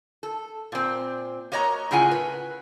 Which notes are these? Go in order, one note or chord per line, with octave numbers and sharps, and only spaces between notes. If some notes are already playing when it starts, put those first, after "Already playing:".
A4
A#2 C4
A#3 F#4 C#5 D#5 A#5
A2 C#3 F4 G#4 F#5 G#5
B4